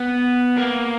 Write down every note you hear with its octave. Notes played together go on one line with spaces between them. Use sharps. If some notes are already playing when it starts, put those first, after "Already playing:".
Already playing: B3
A#3